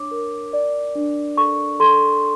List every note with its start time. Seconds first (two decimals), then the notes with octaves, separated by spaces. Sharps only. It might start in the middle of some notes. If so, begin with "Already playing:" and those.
Already playing: D4 C#5 D6
0.11 A#4
0.53 D5
0.96 D4
1.37 A4 C#6
1.80 A4 C6